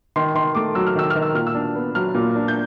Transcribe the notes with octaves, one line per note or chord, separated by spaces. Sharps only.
D#3 C6
D#3 C6
A3 D6
F#3 E6
F6
D#3 E6
F6
D#3
E6
A#2 F6
E6
D4
B3
F#3 F6
A#2
D4
G6